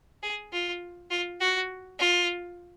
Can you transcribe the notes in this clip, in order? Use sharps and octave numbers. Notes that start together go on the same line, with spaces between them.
G#4
F4
F4
F#4
F4